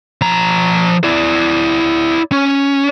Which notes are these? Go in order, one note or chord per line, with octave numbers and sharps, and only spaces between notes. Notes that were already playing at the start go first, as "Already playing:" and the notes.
F3 A#5
E4 D5
C#4